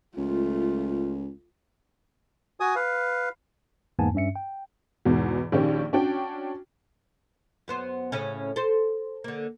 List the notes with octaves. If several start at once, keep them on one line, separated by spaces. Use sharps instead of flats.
C#2 A3 F4
F#4 G#5 D#6
B4 F5
E2 G#2 A#3 B3 G#5 A5
G2 C#4 E5 C#7
G5
E2 G#2 B2
A#1 D#3 C#4 G4
C#4 D4 F#4 G5
F#2 B3 C5
A2 C#3 C#4
A4 C5
D3 A#3